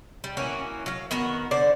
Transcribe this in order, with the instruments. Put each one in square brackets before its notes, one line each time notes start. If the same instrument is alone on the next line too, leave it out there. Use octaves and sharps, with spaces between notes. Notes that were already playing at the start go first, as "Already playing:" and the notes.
[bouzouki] G3
E3 A#3 C#4 F#4
F#3 F5
D#3 B3 F#4 A#4
D3 C5 D5